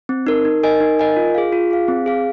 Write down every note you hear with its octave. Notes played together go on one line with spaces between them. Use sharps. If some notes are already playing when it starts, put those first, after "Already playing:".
C4
D#4 A#4
D#4
A#4 D#5 G#5
D#4
A#4 D#5 G#5
F4
G#4 F5
F4
G#4 F5
C4
G#4 F5